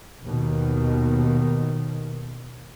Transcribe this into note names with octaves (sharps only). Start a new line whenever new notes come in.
D#2 B2 D#3